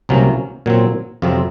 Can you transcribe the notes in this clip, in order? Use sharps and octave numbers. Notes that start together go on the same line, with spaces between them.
C2 C3 F#3 A#3 C#4
A#2 F#3 C4
F2 C3 F#3 C4 F4